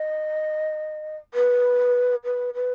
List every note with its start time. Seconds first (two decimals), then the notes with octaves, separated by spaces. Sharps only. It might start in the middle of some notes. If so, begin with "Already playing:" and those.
Already playing: D#5
1.34 B4
2.25 B4
2.54 B4